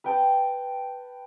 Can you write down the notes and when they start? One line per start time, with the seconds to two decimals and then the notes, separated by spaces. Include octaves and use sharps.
0.04 B4 G5 A5